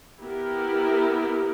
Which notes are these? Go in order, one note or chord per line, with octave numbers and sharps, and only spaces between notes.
B3 E4 G4 A#4